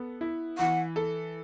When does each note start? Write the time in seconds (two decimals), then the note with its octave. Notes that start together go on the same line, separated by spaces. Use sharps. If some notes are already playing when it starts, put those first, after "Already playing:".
Already playing: B3 A4
0.21 E4
0.58 E3 F#5
0.96 A4